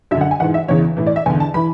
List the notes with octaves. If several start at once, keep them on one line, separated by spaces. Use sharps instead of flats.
F#2 D3 E5
F#5
G#5
G#2 E3 F#5
E5
E2 C#3 E3 C#5
A2 E3
D5
E5
E2 D3 G#5
A5
E3 B5